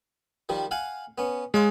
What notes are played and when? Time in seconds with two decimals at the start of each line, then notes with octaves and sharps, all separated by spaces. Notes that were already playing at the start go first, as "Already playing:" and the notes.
0.49 D#3 F3 G3
0.71 F5 F#5 G#5
1.18 B3 C#4
1.54 G#3 C#5 F5 C6